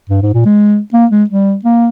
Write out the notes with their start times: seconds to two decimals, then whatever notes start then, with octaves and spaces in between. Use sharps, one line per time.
0.10 G2
0.22 G#2
0.34 A#2
0.45 G#3
0.93 A#3
1.11 G#3
1.30 G3
1.65 A#3